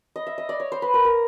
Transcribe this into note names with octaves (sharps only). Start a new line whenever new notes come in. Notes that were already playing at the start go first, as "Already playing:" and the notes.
D#5
E5
D#5
D5
C#5
C5
B4
A#4
A#4